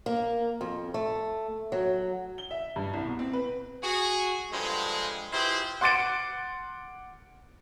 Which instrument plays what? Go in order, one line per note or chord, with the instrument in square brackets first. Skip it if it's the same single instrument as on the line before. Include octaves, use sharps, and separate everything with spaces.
[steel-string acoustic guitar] A#3
F2
A3
F#3
[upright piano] G7
E5
G2
C2
B2
C4
B4
[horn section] F#4 G#4
G2 D3 F3 G#3
E4 F4 G4 G#4 B4 C5
[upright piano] F#5 C6 D6 A6 C#7 D7